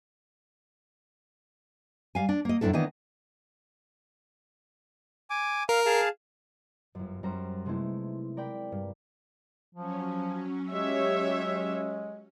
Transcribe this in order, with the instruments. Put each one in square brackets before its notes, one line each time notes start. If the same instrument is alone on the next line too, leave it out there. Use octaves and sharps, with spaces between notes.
[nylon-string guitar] G3 F5 G#5
D4
A#3 D#5
F#2 A2 F3 D4 E4 A4
D#3 E3 B3 D4 D#5
[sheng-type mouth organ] G#5 D6
[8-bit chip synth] A#4 [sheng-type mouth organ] F5
[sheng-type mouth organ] G#4 F5 A5
[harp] G1 F#2
F#2 G3 C#4 C5 A#5
C3 G#3 A3 B3 D#4 E4
A#4 D5 G5 B5
G2
[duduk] F3 [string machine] F#3 C#4
[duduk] G#3 [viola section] G4 C#5 E5